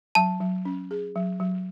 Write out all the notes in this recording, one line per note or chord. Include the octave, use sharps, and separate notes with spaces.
F#3 A5
F#3
C#4
G#4
F#3
F#3